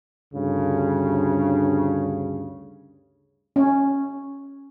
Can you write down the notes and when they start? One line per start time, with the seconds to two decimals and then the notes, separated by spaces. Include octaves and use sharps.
0.34 D2 G2 C#3
3.56 C#4